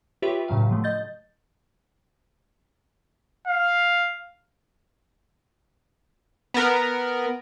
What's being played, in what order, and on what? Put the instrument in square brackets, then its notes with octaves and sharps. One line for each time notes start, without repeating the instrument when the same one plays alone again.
[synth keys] F4 G4 B4 C#5 E5
A2 C#3 F#3 F5
D3 F3 A3
D#5 G6 A6
[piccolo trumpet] F5
[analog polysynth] B3 A#4